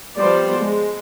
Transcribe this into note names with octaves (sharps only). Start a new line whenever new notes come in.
F3 G3 B3 C5 D5
G#3